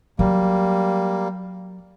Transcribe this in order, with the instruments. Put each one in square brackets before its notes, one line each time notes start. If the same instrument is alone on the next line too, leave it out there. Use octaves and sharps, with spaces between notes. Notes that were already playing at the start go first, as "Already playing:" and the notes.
[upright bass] F#3 [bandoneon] G3 A#3